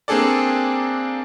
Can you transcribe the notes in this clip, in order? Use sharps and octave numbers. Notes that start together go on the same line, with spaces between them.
A#3 C4 D4 G#4 A4 D5